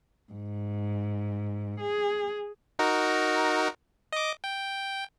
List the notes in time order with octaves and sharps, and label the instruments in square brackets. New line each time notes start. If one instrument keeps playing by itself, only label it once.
[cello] G#2
G#4
[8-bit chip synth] D#4 F#4 A#4
D#5 D6
G5